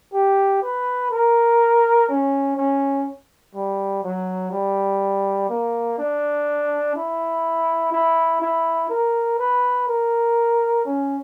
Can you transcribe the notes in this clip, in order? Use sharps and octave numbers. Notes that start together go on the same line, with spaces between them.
G4
B4
A#4
C#4
C#4
G3
F#3
G3
A#3
D4
E4
E4
E4
A#4
B4
A#4
C#4